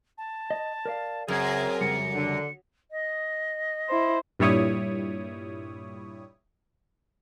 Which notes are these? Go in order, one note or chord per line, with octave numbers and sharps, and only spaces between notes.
A5
D#5
A#4 D5 F5
C#2 F#2 C4 G#4 A#4 G#6
F2 C#3 G3 C#7
D3
D#5
E4 C5
G2 A#2 G3 E4 C#5 D#6